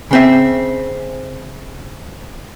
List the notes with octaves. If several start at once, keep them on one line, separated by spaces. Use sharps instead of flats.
C#3 C4 E5